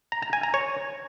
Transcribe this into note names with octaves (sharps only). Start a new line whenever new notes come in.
A#5
A#5
G#5
A#5
C#5